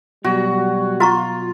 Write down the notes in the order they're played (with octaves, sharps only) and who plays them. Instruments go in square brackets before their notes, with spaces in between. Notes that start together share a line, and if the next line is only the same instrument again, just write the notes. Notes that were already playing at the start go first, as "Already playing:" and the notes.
[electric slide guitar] B2 F#3 [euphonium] G3 [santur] F#4
[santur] F4 [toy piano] F#4 A#5 C#6